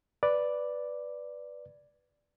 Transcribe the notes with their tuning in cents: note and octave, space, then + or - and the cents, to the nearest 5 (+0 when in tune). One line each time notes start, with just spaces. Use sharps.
B4 +0 D5 +0